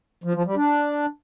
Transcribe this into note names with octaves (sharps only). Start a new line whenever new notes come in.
F3
F3
G3
D4